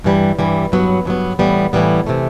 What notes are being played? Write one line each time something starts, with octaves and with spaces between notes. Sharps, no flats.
G2 E3 G3
G2 E3 G3
G2 F#3 B3
G2 F#3 B3
A2 E3 G3 B3
A2 E3 G3 B3
C3 E3 A3